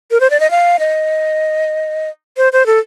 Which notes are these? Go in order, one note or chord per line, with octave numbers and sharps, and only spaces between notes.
A#4
C5
D5
D#5
F5
D#5
C5
C5
A4